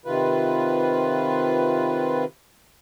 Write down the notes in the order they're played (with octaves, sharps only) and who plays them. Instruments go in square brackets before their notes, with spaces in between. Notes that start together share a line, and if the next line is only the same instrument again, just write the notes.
[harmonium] C3 D#3 F4 B4